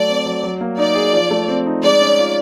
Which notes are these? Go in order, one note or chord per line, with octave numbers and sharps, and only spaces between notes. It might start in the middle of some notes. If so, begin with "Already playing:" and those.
Already playing: F#3 A3 D5
C4
F#3
F#3
A#3
D#4 D5
G#4
F3
A3
C4
D#4
G#3 D5
C#4
F4